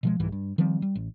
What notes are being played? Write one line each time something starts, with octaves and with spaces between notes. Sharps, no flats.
B2 F3 G#3
C2 G#2 E3
G2
D#3 F3 G3 C4
G3
A1